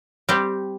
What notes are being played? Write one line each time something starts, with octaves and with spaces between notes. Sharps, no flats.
G3 C4 G4